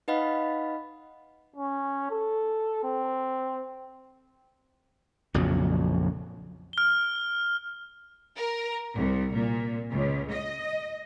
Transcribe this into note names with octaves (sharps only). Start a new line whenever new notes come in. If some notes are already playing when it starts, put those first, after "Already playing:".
D#4 B4 D#5 F5 F#5 B5
C#4
A4
C4
A#1 F2 C#3 F#3
F6 G7
A#4
C2
A#2
C#2
D#5